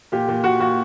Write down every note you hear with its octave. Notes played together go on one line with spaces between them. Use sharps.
A#2 G4
A#2
A#2 F#4
A#2 F#4